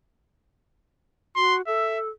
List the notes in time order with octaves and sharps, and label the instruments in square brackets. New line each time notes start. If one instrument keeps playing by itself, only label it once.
[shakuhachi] F#4 [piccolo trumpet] C6
[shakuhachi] A4 [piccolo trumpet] E5